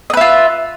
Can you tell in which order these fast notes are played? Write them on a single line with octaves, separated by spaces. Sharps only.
D#5 B4 E5 F4